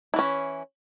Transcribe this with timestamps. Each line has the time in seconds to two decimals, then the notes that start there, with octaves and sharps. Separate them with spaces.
0.14 E4
0.16 E3
0.19 C#4